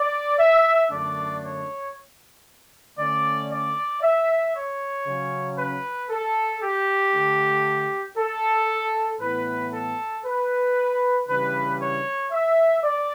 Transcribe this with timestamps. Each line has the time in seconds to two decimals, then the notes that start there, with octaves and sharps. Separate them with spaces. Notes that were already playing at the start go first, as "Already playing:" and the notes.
Already playing: D5
0.38 E5
0.90 F#2 D3 A3 D4 D5
1.42 C#5
2.97 D3 A3 C#4 D5
3.49 D5
4.01 E5
4.54 C#5
5.05 C#3 F#3 C#4
5.56 B4
6.09 A4
6.61 G4
7.12 D3 A3 D4
8.16 A4
9.19 A2 E3 B3 B4
9.71 A4
10.24 B4
11.27 C#3 E3 G3 D4 B4
11.79 C#5
12.30 E5
12.83 D5